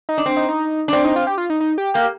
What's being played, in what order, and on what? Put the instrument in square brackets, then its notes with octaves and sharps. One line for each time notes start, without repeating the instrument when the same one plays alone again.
[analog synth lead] D#4
[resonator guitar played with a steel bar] D4
C4
[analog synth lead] D#4
D#4
[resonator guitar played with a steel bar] D4
[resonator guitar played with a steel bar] C4 [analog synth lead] D5
[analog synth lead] D#4
F4
G4
F4
D#4
D#4
G4
[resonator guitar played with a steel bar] A#3 [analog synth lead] G4